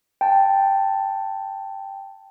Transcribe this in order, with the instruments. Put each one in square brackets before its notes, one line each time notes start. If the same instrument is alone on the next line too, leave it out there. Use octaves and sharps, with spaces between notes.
[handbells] G5 A5